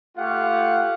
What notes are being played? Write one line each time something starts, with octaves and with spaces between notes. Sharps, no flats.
A3 F4 G4 F5 F#5